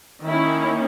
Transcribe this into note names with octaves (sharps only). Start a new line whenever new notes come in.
D#3 A#3 C#4 E4